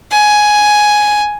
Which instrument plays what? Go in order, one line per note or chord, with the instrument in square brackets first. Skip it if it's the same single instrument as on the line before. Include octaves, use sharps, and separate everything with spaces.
[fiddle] G#5